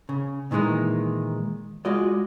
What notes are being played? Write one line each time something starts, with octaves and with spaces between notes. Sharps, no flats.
C#3
A#2 D#3 E3 G#3 D#4
G#3 F4 F#4 D5 D#5